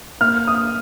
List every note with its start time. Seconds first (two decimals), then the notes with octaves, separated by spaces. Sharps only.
0.21 A#3 F6
0.47 D#6